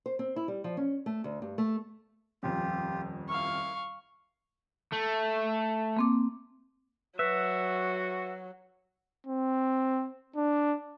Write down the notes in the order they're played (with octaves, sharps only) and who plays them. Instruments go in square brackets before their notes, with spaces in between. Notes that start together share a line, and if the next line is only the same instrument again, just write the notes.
[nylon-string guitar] C5
C4
E4
G3
F3
C#4
A3
D2
G2
A3
[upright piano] D#1 F2 [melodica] F4 G4
[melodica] E4 A#4 [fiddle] F5 C#6
[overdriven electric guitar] A3
[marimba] A#3 C4 D6
[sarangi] F#3 [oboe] F#4 [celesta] B4 F#6 B6 [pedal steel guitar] E5
[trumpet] C4
D4